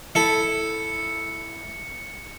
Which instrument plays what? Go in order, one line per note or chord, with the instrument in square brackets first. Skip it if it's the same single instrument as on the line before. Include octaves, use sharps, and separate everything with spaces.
[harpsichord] E4 A4 [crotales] C#7